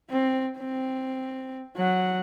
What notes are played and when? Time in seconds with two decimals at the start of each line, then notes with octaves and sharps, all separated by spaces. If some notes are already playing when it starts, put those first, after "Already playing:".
0.10 C4
0.58 C4
1.77 F#3 F#5